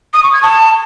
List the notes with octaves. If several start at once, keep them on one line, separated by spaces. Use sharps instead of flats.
D#6
C#6
G#6
A5